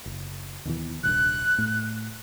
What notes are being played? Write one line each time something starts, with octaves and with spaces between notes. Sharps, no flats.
F#1
D#2 B2 E3
D#1 C2 G2 F#6
A2 A3